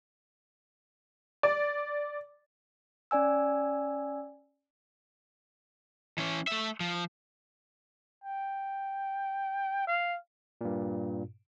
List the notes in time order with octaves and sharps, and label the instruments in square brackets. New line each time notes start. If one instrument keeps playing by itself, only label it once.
[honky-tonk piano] D5
[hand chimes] C#4 D5 G#5 E6
[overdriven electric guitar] E3 C#4
A3 E5
F3
[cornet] G5
F5
[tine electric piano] G2 A#2